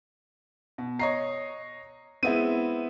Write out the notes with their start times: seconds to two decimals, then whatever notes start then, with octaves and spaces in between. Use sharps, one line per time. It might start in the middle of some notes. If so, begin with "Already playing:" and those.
0.78 B2
0.99 C#5 D#5 A#5 C7
2.23 G#3 B3 C4 E4 D#7